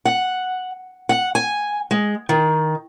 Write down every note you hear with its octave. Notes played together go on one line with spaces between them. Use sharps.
F#5
F#5
G#5
G#3
D#3